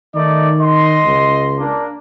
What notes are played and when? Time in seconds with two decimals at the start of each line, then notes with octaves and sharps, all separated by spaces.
0.15 D#3 A3 D#4 D5
0.61 D#5 C6
1.05 C#2
1.59 A#3 D4